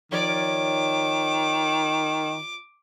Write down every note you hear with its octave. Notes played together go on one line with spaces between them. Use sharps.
D#3 F3 C#5 D5 D6